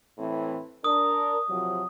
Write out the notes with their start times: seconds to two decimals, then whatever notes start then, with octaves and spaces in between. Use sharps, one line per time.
0.18 A2 E3 C4
0.84 D4 A#4 D#6
1.49 C3 F3 F#3